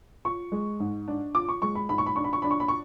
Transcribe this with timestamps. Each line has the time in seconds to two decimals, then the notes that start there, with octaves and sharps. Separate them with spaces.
0.25 F4 C#6
0.52 G#3
0.80 G#2
1.08 D4
1.34 F4 D6
1.49 C#6
1.62 G#3 C#6
1.75 B5
1.89 G#2 B5
1.98 C#6
2.06 B5
2.16 D4 C#6
2.24 B5
2.33 C#6
2.42 D4 B5
2.51 C#6
2.60 B5
2.68 C#6